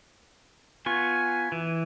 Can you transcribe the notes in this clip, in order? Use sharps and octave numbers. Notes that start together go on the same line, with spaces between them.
B3 F4 G#5 C#6
E3